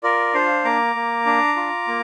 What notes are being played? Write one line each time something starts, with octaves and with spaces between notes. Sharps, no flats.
F4 A#4 D5
D4 C5 F5
A#3 A#5 D6
A#3
D4
F4
A#3